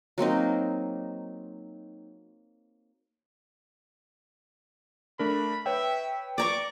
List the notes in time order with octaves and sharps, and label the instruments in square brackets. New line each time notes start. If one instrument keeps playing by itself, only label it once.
[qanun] F#3 A#3 C4 D#4
[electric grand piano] A3 D4 A#4 [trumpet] B5
[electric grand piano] B4 C#5 G5 [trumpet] E5
[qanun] D5 A#5 C#6 [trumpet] D6